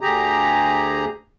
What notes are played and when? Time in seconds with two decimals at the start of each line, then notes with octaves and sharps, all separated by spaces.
0.01 D2 D3 G4 G#4 A#5